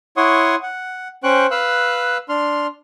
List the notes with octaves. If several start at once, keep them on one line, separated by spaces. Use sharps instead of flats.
E4 C#5 F#5 C6 C#6 D#6
F#5
C#4 C5 G5 C#6 F#6
B4 F5 E6 F#6
D4 C6 F6